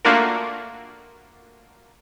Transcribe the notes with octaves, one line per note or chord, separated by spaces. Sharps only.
A3 A#3 D4 F4 F#4 A#4